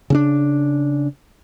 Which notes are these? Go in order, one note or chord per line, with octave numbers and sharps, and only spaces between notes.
C#3 C#4 D4